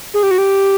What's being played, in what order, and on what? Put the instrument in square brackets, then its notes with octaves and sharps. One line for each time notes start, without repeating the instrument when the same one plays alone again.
[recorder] G#4
G4
F#4
G4